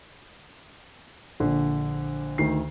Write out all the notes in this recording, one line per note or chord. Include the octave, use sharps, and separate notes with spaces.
A#1 D3
D2 D#3 C7